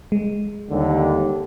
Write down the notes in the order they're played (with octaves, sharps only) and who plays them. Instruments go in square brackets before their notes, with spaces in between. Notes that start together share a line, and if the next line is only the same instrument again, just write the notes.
[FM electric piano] G#3
[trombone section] D#2 D3 G3